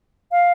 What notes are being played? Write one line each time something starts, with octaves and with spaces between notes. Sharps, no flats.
F5